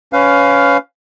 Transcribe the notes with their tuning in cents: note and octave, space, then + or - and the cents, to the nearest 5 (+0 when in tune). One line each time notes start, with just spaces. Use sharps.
C#4 +15 B4 +30 F5 +5